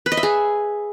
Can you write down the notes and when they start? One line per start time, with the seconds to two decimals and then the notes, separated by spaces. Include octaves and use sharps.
0.06 B4
0.12 D#5
0.17 E5
0.23 G#4